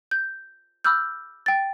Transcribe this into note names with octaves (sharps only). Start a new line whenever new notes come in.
G6
B5 D6 E6 F6 G6
G5 A6